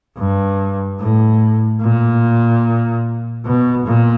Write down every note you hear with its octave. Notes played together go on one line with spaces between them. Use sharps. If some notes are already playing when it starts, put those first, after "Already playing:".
G2
A2
A#2
B2
A#2